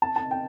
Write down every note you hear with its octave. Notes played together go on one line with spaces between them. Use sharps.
A5
A5
G5